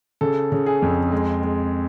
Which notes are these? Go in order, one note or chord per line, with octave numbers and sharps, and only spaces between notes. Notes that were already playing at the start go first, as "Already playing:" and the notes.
C#3 A4
C#3
G#4
F2
G#3
G#3